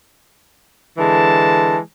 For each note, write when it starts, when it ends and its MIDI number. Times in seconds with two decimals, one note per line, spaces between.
0.98 1.79 50
0.98 1.79 52
0.98 1.79 56
0.98 1.79 81